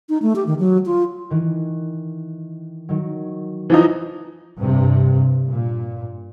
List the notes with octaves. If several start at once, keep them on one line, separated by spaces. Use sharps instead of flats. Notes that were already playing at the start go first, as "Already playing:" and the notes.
D#4
A3
G4
D#3
F#3
F4
D#3 E3
D#3 F#3
E3 F3 D#4
G2 C3
A#2